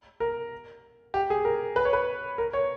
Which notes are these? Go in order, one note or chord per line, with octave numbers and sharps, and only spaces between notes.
A#4
G4
G#4
A#4
B4
C#5
B4
A#4
C#5